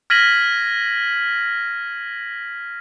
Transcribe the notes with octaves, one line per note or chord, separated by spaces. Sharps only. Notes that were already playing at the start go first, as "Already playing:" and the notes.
F6 G#6 A#6 B6 D#7 F#7